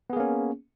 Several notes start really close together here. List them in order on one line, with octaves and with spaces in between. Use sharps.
B3 G#4 A#3 C#4